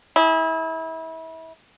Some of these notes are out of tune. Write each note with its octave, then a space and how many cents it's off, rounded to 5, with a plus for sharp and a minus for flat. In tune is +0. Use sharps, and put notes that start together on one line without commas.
E4 -30 G#4 +0